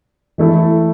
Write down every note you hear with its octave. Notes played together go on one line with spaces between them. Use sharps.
E3 A3 E4 A4